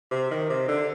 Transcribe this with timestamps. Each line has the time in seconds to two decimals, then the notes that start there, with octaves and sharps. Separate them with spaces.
0.11 C3
0.31 D#3
0.49 C3
0.68 D3